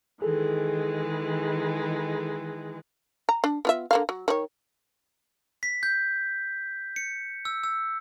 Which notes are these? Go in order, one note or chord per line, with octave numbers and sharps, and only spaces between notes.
D#3 E3 G#3 G#4 A4
A#5
D4
B3 F4 E5
D3 A#3 F5
F#3
D#3 C#5
B6
G6
C#7
E6
E6